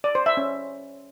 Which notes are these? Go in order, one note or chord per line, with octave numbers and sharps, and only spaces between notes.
D5
C5
E5
C#4